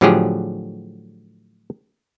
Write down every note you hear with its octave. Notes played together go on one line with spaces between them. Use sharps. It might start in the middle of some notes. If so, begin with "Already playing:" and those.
A2 D3 F3 F#3 G4 G#4